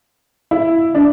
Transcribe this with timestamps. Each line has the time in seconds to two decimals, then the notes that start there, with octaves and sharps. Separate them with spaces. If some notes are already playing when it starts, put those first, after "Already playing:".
0.51 E4
0.95 D4